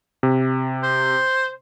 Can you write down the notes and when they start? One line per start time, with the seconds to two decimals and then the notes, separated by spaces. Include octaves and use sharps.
0.23 C3
0.83 C5